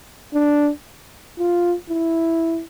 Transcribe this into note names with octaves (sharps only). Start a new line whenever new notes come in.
D4
F4
E4